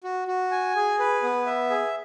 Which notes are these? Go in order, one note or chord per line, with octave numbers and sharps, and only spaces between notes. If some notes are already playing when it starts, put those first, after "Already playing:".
F#4
F#4
G#5
G#4
B4
B3
E5
G#4